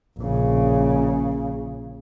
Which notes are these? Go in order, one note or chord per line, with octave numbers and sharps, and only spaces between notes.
A#1 C#3